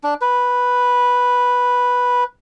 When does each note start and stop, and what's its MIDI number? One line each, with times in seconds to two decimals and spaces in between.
0.03 0.14 62
0.21 2.24 71